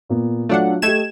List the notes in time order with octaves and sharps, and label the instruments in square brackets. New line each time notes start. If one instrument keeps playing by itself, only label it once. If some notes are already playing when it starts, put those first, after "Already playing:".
[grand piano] A#2 A#3 B3
[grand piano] F#3 F4 [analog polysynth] A3 D4 F#5
[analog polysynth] A3 G#6 E7 [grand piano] G4 D#5